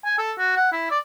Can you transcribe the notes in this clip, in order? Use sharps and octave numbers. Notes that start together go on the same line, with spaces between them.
G#5
A4
F#4
F#5
E4
D5